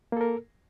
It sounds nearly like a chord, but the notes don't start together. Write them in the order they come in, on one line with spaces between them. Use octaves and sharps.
A#3 A4 A#4